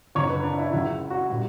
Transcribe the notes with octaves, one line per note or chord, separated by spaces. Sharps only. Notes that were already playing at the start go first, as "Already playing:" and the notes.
F#1 F#2 D3 C#5
B4
D4
E4
C#2 C#3 F#3 E4
F#4
A#2 G3